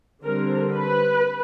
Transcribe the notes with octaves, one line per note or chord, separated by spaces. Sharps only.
D3 G3 C4 A#4
B4